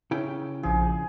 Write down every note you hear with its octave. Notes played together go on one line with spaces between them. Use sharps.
C#3 E4 G5
A#1 F3 G#4